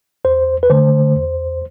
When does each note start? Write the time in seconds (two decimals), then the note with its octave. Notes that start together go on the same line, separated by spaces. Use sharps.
0.25 E2 C5
0.63 B4
0.70 D3 A3 C5
1.15 E2